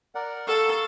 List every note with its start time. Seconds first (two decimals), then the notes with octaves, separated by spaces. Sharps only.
0.15 A#4 D5 F#5
0.48 A4 F5 C#6